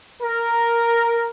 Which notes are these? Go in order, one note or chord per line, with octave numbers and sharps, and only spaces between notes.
A#4